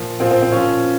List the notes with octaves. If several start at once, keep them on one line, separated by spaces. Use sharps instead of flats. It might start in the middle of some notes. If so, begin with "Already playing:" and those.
Already playing: A#2 F3
A#2 F3 C4
C4
C4
A#2 F3 C#4